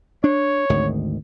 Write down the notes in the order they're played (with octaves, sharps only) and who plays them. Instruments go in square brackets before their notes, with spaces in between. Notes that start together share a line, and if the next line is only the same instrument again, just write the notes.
[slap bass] D4 [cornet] C#5
[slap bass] G#1 D2 D#3